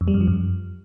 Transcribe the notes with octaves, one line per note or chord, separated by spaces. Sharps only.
F2
G3
F#2
F3
F#2